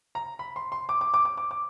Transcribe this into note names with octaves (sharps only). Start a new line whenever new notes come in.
A#5
B5
C6
C6
D6
D6
D6
D6
D6
D6